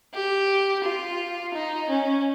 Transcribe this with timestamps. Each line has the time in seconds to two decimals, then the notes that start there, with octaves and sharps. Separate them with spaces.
0.14 G4
0.84 F4
1.54 D#4
1.89 C#4